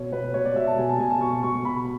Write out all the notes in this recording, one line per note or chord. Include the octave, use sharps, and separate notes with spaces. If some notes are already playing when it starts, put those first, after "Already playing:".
Already playing: B2 C#5
B2 B4
B2 C#5
D5
B2 E5
A5
B2 G#5
A5
B2 G#5
A5
B2 C#6
B2 C#6
B2 B5